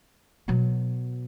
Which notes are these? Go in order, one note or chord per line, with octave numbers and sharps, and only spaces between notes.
B2 F#3